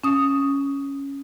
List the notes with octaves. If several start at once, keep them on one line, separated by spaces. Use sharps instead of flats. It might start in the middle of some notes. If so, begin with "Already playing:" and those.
C#4 D#6